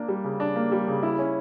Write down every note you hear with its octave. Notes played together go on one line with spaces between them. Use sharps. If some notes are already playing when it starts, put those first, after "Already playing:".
Already playing: A#3 D4
G3
C#3
D4
A#3
G3
C#3
E4
C#4